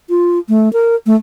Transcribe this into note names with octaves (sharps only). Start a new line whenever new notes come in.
F4
A3
A#4
A3